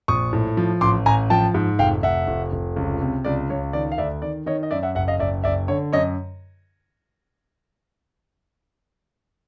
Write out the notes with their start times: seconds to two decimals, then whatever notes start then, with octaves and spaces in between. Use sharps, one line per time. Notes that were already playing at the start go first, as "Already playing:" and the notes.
0.08 A#1 C#6 D#6
0.33 A2
0.57 F3
0.81 A1 C6 D6
1.06 A1 G#5 A#5
1.30 F3 G5 A5
1.54 G#2
1.79 F1 F5 G5
2.03 F1 E5 F#5
2.27 F1
2.52 F1
2.76 C#2
3.01 C3
3.25 C#2 D5
3.50 C#2 C#5
3.73 D#3 D5
3.92 F5
3.98 D2 D5 E5
4.22 D#3 D5
4.46 D#3 C#5 D#5
4.63 D#5
4.71 F#2 D5 E5
4.83 E5 F#5
4.95 F#1 E5 F#5
5.08 D#5 F5
5.19 F#1 D5 E5
5.44 F#1 D5 E5
5.68 D3 C#5
5.93 F#2 C#5 D#5